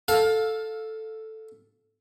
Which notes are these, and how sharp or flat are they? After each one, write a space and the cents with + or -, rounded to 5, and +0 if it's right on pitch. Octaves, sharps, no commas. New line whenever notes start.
A4 +0 F5 +20